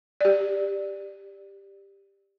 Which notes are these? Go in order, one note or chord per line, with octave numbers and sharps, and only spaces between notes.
G4 D5